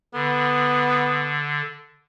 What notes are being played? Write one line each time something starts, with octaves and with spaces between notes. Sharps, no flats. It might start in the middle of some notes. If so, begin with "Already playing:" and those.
D3 B3